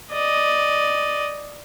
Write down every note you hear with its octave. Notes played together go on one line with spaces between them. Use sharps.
D5 D#5